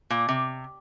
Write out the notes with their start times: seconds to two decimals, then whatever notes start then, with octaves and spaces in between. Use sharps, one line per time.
0.10 A#2
0.29 C3